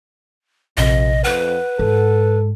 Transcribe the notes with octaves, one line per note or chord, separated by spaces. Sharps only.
A#1 F2 C3 D#5
F2 B4 F#5
G#2 A4